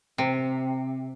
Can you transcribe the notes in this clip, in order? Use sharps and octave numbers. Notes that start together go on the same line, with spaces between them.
C3